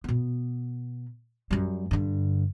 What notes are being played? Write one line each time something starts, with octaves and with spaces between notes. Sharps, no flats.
B2 B3
F#2 G3
G2 D3